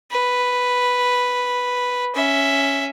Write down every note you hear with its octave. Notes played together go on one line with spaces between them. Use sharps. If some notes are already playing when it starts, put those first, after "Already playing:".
B4
C#4 E5